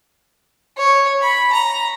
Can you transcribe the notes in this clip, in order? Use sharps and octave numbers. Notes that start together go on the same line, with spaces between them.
C#5
B5
A#5